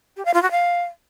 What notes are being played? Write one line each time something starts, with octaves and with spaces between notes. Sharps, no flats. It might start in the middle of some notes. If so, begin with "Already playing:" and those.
G4
F5
F4
F#4
F5